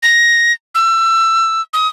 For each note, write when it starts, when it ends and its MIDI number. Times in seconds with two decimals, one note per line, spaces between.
0.03 0.52 94
0.75 1.62 88
1.73 1.88 87